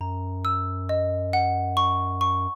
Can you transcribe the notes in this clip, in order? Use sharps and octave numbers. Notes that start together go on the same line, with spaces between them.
F#2 A#5
E6
D#5
F#5
C#6
C#6